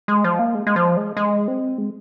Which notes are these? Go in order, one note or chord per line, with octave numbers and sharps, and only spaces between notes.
G#3
F3
A#3
G#3
G#3
F3
G#3
G#3
C4
G#3